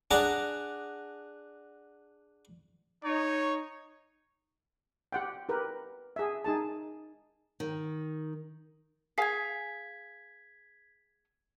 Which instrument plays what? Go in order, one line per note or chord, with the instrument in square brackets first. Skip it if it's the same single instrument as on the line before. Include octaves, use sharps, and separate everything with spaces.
[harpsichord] D4 G#4 F#5 A#5 D6
[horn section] D#4 [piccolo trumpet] C#5
[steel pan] G4 F#5 G5
G4 A#4 B4
G#4 E5
D#4 G#4 A5
[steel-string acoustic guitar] D#3
[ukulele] G#4 F5 G#5 [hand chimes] G#6 B6